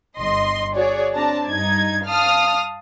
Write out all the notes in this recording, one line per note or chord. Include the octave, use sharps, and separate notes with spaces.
G1 D#5 C6
F#4 G#4 C#5 D5
C4 D4 D5 A5 A#5
G2 D#4 G#6
F5 A5 D#6 F6